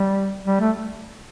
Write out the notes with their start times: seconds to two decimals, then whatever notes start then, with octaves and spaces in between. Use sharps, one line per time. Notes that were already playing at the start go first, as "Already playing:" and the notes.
Already playing: G3
0.46 G3
0.60 A3